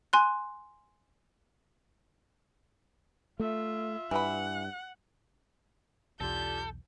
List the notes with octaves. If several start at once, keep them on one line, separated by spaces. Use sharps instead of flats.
G#5 C6 F#6
A3 F4 E5
G2 E3 F#5 B5
B1 E2 D3 F4 G4 A4 G6